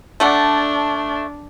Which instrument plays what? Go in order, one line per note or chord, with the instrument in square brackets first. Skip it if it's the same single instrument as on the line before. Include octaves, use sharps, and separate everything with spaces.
[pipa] A3 D5 F#5 [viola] D4